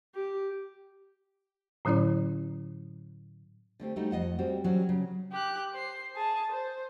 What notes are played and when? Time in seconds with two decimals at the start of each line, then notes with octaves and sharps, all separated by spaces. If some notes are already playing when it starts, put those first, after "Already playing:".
0.14 G4
1.85 A2 D3 F#3 C#4 E4 D5
3.80 D3 A3 C4 G4
3.96 G3 A3 D#4 F#4
4.11 F2 D#5 F#5 A5
4.39 G3 C4 F#4
4.64 E3 F#3 G3 C#4 F#4
4.89 C#3 F#3
5.32 G4 F#6
5.73 C5 C7
6.16 G#4 A5
6.52 C5